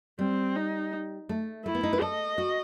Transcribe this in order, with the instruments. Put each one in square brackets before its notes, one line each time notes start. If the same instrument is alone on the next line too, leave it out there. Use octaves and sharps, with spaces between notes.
[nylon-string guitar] G3 [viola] C4
[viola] D#4
[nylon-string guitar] A3
[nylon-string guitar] A3 [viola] E4
[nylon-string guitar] B3
D#4
B4
[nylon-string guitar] A4 [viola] D#5
[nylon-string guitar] F#4